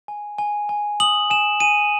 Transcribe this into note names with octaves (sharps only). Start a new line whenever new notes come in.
G#5
G#5
G#5
D#6 F#7
G#5 E7
G#5 D#7